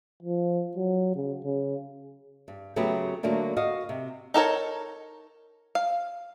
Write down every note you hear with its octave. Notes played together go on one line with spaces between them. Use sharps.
F3
F#3
C#3
C#3
G2
C#3 F#3 A3 B3 G4 B4
D3 F#3 A3 A#3 D4
F#4 D#5 F5
C3
D#4 A4 A#4 C#5
F5